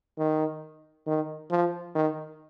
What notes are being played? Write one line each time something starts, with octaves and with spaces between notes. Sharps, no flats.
D#3
D#3
F3
D#3